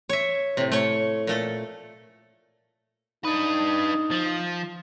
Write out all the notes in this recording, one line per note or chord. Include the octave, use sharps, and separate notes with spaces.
C#5 E5
A2 C3
A3 C#5
A#2 A3 A4
D4 D#4 B4
F3